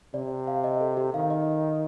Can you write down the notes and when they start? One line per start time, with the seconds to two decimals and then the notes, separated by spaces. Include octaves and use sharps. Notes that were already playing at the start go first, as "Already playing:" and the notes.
0.14 C3 D5
0.47 F5
0.64 D#5
0.81 A4
0.97 G4
1.13 D#3 F5
1.30 D#5